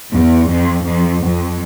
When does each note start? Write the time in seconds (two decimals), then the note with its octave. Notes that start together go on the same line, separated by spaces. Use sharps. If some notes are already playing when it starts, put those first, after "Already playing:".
0.11 E2
0.48 F2
0.85 F2
1.22 F2